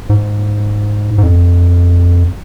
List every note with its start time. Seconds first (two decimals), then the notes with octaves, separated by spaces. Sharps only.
0.10 G#2
1.18 G#2
1.23 F2